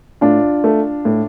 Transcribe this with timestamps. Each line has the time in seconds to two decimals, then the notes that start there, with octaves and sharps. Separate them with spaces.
0.21 A2 D4 F4
0.64 A3
1.05 A2